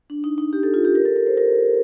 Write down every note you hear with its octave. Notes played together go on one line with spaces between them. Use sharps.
D4
D#4
D#4
G4
A4
F4
G4
A#4
A4
A#4
C5
A#4